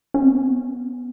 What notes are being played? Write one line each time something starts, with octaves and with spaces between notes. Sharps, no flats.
C#4
C4
B3